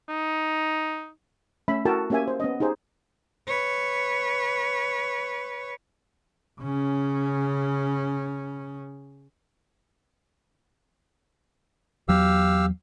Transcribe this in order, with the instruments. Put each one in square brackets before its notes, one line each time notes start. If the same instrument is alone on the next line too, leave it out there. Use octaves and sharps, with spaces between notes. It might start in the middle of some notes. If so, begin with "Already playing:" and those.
[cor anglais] D#4
[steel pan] A3 C#4 E5 B5
E4 F#4 A4 A#4 G5 A5
A#3 C#4 G4 E5 G#5
C5
B3 C#4 D#5
D#4 G4 G#4 C5
[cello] B4 C#5
[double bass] C#3 C#4
[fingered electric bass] E2 F#3 [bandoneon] G4 F5 E6